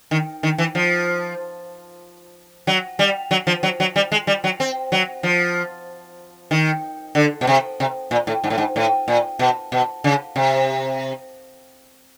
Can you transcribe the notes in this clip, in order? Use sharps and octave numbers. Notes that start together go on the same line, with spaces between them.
D#3
D#3
E3
F3
F#3
G3
F#3
F3
F#3
F#3
G3
G#3
G3
F#3
C4
F#3
F3
D#3
D3
B2
C3
C3
A#2
A2
G#2
A2
G#2
A2
A#2
B2
B2
C#3
C3